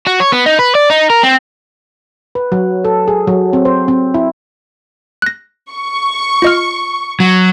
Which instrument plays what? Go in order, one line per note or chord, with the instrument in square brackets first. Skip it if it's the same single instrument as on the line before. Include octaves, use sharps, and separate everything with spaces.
[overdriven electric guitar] F#4
C#5
B3
D#4
B4
D5
D#4
A#4
C4
[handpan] B4
F#3
A4
G#4
F#3
C4
C5
C4
E4
[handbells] F#6 A#6
[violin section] C#6
[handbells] F4 D#5 F6
[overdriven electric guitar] F#3